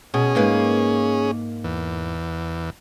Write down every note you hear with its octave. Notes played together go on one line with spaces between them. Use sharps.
B2 C#4 G#4
G#2 A#3 B4
E2